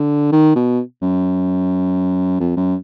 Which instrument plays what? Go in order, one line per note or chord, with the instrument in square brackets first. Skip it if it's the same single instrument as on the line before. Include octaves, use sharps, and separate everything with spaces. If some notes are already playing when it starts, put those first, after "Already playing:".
Already playing: [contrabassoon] D3
D#3
B2
F#2
F2
F#2